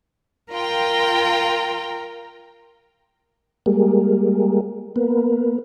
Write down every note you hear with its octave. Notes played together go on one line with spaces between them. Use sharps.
F4 A#4 G5
G3 G#3 A#3
A#3 B3